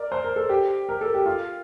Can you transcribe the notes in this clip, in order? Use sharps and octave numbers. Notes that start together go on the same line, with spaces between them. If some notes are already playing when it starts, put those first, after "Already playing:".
Already playing: A#4 D5
C5
A#4
A4
G4
A#4
A4
G4
F4